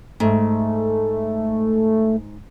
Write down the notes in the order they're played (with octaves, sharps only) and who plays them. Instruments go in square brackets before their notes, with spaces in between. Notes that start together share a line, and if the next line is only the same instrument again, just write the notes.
[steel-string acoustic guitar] G#2 [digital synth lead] A3